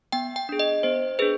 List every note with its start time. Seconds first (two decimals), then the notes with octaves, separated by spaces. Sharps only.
0.12 B3 G5
0.36 G5
0.49 D4 G#4
0.59 D#5
0.83 B3 C5
1.19 D4 G#4 B4